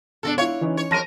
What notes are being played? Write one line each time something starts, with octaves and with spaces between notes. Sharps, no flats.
E1 D4 F#4 A4
E4 C#5 F5
E3 C#4 D#4
C#5
F2 A#4 A5 A#6 D#7